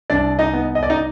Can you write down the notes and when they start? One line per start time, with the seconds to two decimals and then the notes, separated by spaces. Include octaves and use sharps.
0.10 C2 D4 D5
0.39 D#4 D#5
0.53 B3
0.75 D#5
0.83 D5
0.90 D#4 D#5